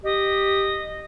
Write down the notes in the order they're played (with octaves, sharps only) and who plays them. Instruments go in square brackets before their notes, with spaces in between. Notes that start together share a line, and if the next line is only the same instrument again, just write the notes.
[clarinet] G4 [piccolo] D#5